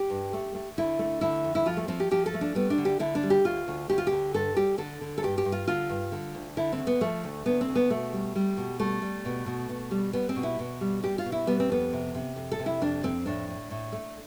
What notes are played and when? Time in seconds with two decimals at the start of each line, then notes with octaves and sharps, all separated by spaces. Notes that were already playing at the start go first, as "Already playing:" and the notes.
Already playing: G4
0.10 G2
0.33 A3
0.55 A3
0.78 D3 E4
0.99 A3
1.21 D3 E4
1.44 F2
1.55 E4
1.66 F3 F4
1.77 A3
1.88 F3 C4
2.00 G4
2.11 F3 G4
2.26 A4
2.34 A3
2.41 D4
2.55 G3 B3
2.70 D4
2.78 D3
2.85 G4
2.99 D3 E4
3.15 D4
3.23 G3
3.30 G4
3.45 D2 F4
3.68 D2
3.89 D2 G4
3.98 F4
4.07 G4
4.12 D3
4.34 G2 A4
4.56 G3 G4
4.78 D3 A4
5.01 D3
5.18 A4
5.23 G2 G4
5.38 G4
5.45 G2
5.52 F4
5.67 D3 F4
5.89 G2
6.12 D3
6.35 D2
6.57 D3 E4
6.72 C4
6.79 D2
6.87 B3
7.01 F3 A3
7.24 D2
7.46 D2 B3
7.61 C4
7.68 D2
7.75 B3
7.90 B2 A3
8.13 G3
8.35 G3
8.57 B2
8.80 G3 A3
9.02 G3
9.25 B2
9.46 B2
9.69 B2
9.91 G3
10.13 G3 B3
10.29 C4
10.36 B2
10.43 E4
10.59 B2
10.81 G3
11.03 G3 G4
11.18 F4
11.25 B2
11.32 E4
11.47 G3 B3
11.60 C4
11.69 F2 B3
11.93 C3
12.15 C3
12.36 F2
12.52 A4
12.59 C3
12.66 E4
12.82 F2 D4
13.03 F2 C4
13.26 A2 D4
13.48 A2
13.70 A2
13.92 A3